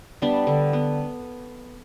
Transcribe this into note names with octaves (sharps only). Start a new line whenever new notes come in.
G3 B3 D4
D3
B3